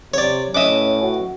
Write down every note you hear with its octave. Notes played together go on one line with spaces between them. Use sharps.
C3 C#5 D5
A2 C#4 B4 D#5 E5 D6 D#6
F#4